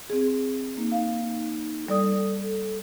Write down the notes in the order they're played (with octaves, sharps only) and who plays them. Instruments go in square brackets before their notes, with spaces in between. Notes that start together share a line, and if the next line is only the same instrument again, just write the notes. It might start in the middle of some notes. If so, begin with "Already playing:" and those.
[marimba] C4 G#4
[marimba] A#3 [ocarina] D#4
[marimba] F5
[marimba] G3 D5 D#6 [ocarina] A4